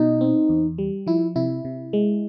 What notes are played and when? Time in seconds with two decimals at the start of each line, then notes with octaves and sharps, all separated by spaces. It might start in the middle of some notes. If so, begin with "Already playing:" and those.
Already playing: B2 D#4
0.21 C4
0.49 E2
0.78 G3
1.07 F3 E4
1.36 C3 E4
1.65 C3
1.93 G#3